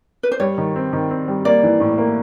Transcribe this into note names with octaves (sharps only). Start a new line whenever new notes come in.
B4
C5
G3 C#5
D#3
C4
D#3
C4
G3
A#3 D5
E3
A2
A#3